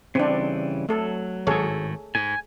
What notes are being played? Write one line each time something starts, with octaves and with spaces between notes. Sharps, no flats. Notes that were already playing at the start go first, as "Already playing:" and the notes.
C#3 E3 G3 C4 D4
F#3 A3 A4
G#1 A2 G#4 A4 C#5
G#2 G#5